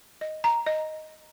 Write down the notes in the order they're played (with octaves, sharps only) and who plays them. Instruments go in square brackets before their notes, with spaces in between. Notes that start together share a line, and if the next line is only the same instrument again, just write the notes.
[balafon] D#5
A#5
D#5